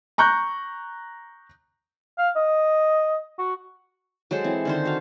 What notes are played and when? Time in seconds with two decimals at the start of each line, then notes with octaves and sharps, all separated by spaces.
0.18 A#5 C#6 F#6 G6
2.18 F5
2.36 D#5
3.39 F#4
4.31 F#3 G#3 A4 C5
4.44 E3 C4
4.65 D3 D#3 C5
4.85 F#4 A4 F5